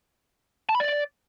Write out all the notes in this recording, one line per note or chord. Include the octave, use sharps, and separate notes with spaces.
A5
B5
D5